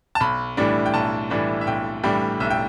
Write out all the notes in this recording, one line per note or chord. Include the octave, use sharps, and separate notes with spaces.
A5
B1 B5
A2 E3 G3 D4
G5
B1 A5
A2 E3 G3 D4
E5
B1 G5
A2 E3 G3 D4 G5
B1 E5
G5